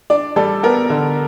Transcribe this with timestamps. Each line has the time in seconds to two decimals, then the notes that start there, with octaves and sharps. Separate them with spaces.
0.10 D4 D5
0.36 G3 A4
0.63 B3 A#4
0.90 D3